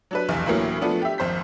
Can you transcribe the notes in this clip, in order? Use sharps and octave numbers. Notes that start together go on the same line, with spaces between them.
F#3 D4 B4
F1 B1 E2
D2 A2 E3 F#3 A#3
F3 A3 B3 D4
G4 E5
G#1 F2 C5 G6 B6